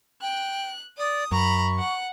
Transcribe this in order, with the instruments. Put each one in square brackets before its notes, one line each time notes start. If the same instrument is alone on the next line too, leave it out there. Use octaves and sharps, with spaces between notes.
[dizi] G5 [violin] F#6
[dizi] D5 [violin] D#6
[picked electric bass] F#2 [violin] A#5 B5 [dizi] C#6
[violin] F#5